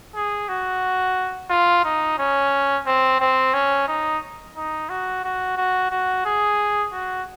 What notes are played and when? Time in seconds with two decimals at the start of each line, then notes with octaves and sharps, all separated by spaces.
0.15 G#4
0.49 F#4
1.50 F4
1.84 D#4
2.19 C#4
2.86 C4
3.20 C4
3.54 C#4
3.88 D#4
4.56 D#4
4.89 F#4
5.24 F#4
5.57 F#4
5.91 F#4
6.25 G#4
6.93 F#4